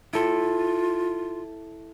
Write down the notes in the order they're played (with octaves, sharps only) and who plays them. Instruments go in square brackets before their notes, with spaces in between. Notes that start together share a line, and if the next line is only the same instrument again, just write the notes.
[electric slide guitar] E4 A4 [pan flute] F4